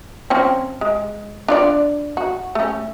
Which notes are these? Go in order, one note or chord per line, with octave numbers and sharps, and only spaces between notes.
F3 C4 C#4
G#3
D4 F4 D5
F#4
A3 C#4